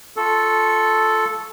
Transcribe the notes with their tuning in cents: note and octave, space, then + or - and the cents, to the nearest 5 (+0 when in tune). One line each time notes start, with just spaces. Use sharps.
F4 +0 A4 -5 C#6 +0